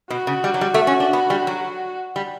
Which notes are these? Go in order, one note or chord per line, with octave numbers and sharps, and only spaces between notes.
B2 F#4
C#3
G3
F#3
G3
A3
C#4
D4
B3
G3
F#3
G3